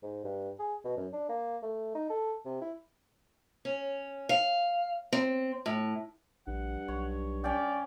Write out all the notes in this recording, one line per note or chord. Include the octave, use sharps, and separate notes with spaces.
G#2
G2
G#4
B2
F#2
D4
A#3
A3
D#4
A4
C3
E4
C#4
F5
C4
A2
A#1 G2 F#5
B1 C#5
C#4 D5 F5 G5